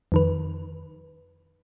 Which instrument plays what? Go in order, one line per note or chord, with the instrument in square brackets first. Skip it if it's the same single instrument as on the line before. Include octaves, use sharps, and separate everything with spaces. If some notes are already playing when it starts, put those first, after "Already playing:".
[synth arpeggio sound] F2 D#3 B4